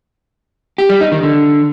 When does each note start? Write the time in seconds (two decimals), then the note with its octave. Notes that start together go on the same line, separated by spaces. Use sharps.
0.78 G4
0.90 G3
1.01 D#4
1.12 D#3
1.23 D3